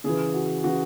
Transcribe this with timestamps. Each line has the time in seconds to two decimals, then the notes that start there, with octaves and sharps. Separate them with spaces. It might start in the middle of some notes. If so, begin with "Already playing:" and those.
0.04 C#3 E3 G#4
0.34 F#4
0.64 C#3 E3 F#4